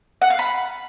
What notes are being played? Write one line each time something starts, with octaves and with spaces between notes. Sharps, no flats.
F#5
F5
B5